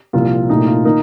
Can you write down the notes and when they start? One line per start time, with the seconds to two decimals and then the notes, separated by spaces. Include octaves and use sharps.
0.13 C2 A#2 F3 F4
0.49 C2 A#2 A3 D#4
0.67 F4
0.85 D#3 A#3 D#4